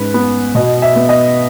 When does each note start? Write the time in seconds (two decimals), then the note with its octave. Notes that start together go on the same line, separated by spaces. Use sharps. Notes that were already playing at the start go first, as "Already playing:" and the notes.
Already playing: G#2 C#4 B4
0.14 B3
0.55 B2 D#5
0.82 E5
0.96 B3
1.09 D#5